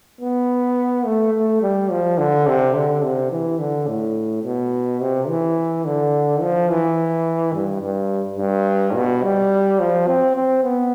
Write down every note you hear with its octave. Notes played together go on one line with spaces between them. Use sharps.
B3
A3
A3
G3
F3
D3
C3
D3
C3
E3
D3
A2
B2
C3
E3
D3
F3
E3
G2
G2
G2
B2
G3
F3
C4
C4
B3